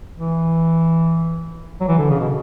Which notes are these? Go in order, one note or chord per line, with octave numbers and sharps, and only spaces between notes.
E3
F#3
E3
D3
C#3
B2